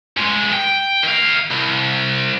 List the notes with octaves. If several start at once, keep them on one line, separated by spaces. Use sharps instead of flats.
G2 G#3
G5
D#3 F5
C2